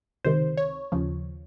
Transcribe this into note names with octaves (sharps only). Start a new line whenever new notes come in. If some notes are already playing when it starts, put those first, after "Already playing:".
C#2 C3 D#3 C5
C#5
D#2 C#3 F3